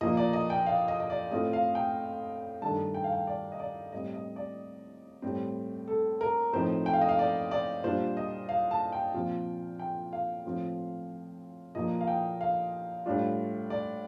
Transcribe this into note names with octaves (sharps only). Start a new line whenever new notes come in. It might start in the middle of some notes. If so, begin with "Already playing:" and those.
A#2 F3 A#3 F4 D#5
D5
D#5
G5
F5
D#5
D#5
D5
A2 A3 C4 F4 D#5
F5
G5
G2 D#3 A3 D4 A5
G5
F5
G5
D5
D#5
D5
A2 G3 C4 D#5
D#5
D5
A2 G3 C4
A4
A#4
A2 F3 C4 D#4 C5
G5
F5
D#5
F5
D5
D5
A#2 G3 D4 F4 C5
D#5
F5
A5
G5
A#2 F3 C4 F4
G5
F5
A2 F3 C4 F4
A#2 F3 A#3 F4 D#5
F5
G5
F5
A2 G3 D4 F4
D5